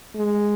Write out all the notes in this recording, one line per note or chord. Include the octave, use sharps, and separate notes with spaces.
G#3